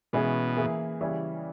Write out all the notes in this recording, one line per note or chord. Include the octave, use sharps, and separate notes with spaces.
B2 E3 G#3 C#4 E4 G#4
E3 A#3 E4 G#4
C#3 E3 G3 C#4 E4